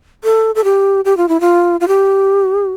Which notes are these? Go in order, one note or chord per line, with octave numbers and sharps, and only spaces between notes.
A4
A4
G4
G4
F4
E4
F4
F4
G4